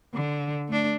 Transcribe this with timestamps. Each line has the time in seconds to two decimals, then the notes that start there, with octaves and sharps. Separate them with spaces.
0.14 D3
0.68 A3 D4